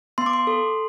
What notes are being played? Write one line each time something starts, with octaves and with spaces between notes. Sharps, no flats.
B3 C6
D6
C6
A4